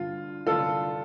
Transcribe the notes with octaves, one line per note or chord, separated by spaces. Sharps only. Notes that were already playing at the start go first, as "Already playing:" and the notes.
Already playing: G2 D3 F4
G2 D3 F4 A4